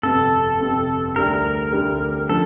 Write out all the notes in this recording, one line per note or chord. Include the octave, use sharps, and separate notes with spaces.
G1 F2 C3 A4
G1 F2 C3
D2 D3 G3 D4 G4 A#4
D2 D3 G3 D4 G4
D3 F3 A4